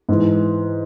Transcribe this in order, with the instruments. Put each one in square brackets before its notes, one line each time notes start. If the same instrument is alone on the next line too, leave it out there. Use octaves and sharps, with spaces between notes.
[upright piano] G#2 E3